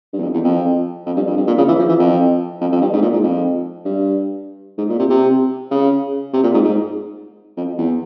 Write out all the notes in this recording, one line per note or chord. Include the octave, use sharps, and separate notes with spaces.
G2
E2
F2
E2
F2
F2
G2
F2
G2
A#2
C#3
E3
F3
E3
F2
F2
F2
G2
G#2
A#2
G#2
F2
G2
G#2
A#2
C3
C3
C#3
C3
A#2
G#2
G#2
F2
E2